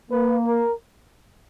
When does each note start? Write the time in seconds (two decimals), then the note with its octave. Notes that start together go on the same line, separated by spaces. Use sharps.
0.10 A#3 B4
0.47 A#4